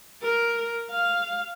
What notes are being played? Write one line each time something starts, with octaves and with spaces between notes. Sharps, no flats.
A#4
F5